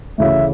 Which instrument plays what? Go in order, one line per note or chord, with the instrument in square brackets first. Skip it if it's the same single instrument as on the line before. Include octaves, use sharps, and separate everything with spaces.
[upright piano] D2 C#3 E3 A3 C#4 [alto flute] E5